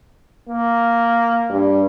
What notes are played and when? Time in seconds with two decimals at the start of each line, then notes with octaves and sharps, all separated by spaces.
0.49 A#3
1.50 G2